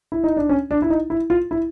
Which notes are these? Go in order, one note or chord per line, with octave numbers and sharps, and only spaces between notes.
E4
D#4
D4
C#4
D4
E4
D#4
E4
F4
E4